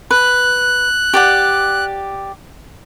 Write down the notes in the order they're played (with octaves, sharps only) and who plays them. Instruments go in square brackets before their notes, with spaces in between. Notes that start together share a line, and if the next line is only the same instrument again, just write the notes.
[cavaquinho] B4 [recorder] F#6
[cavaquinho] G4 D5 F#5